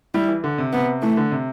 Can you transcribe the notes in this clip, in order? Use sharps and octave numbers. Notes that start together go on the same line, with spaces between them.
G3 E4
E3
D3
C3
C3 B3
E3 A3
D3
C3